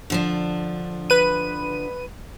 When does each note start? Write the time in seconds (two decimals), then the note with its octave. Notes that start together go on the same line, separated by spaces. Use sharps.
0.10 D3 F3 D4
1.10 B4 D#7